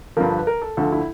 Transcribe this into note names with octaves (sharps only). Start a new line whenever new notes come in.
G2 D3 F3 A#4
B4
A#4
A4
D2 D3 F3 A4
E4